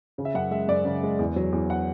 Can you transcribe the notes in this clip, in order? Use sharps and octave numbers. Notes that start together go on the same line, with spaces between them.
C#3
E5
F#2 F#5
G#3 E5
F#2 D5
C#3
G#3
E2
F#3
E2
F#5